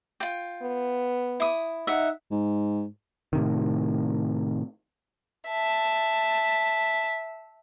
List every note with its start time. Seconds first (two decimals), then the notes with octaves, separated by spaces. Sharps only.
0.20 F4 G5
0.62 B3
1.40 E4 D#6
1.87 D#4 E5 F#5
2.31 G#2
3.33 A2 C3 D#3
5.49 E5 A5